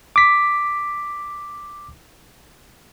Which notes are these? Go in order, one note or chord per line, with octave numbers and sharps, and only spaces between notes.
D6 B6